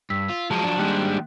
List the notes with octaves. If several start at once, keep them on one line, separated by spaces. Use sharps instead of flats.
G2 E6 B6
F4
F3 F#3 G#3 A5
D4
D#3 G3 G#3 A#3 F#6